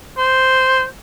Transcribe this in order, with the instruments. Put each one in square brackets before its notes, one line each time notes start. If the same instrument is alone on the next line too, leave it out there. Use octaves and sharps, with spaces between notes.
[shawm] C5